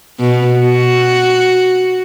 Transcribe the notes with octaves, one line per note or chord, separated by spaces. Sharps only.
B2
F#4